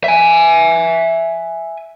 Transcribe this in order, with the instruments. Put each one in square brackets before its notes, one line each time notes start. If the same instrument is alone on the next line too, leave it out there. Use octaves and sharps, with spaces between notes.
[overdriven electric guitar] E5 G#5